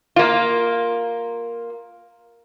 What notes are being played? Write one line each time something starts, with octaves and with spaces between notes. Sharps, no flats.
A#3 F4